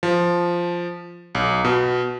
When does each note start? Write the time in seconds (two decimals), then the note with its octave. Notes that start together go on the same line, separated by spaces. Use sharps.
0.03 F3
1.35 B1
1.65 B2